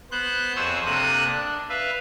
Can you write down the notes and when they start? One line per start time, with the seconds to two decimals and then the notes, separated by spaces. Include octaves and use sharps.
0.11 B3 C5 F#6 G6
0.56 F2 G#4 C5 C#5 E6
0.86 C3 A#3 D4 A4 D#6 F#6
1.27 D4
1.69 B4 E5 F5